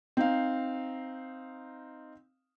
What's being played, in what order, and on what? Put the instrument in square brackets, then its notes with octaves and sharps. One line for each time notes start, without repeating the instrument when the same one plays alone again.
[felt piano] C4 D#4 F5